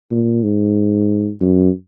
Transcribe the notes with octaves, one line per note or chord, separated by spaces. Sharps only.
A#2
G#2
F#2